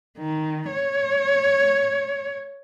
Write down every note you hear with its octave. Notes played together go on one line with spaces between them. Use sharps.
D#3
C#5